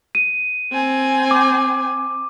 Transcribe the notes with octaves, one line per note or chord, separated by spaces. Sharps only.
D#7
C4 G#5
D6